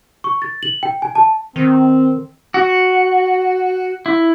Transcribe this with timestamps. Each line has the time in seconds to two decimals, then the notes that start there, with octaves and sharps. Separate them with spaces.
0.24 C#6
0.42 A6
0.63 F#7
0.83 G5
1.02 G#5
1.15 A5
1.56 D#3 C4
2.54 F#4
4.06 E4